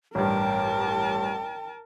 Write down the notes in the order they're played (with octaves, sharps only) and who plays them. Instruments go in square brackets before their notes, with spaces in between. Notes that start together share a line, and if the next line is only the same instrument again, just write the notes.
[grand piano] A1 G2 [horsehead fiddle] A#4 A5 [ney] G5